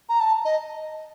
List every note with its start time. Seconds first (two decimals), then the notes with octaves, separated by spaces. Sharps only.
0.09 A#5
0.20 A5
0.45 D#5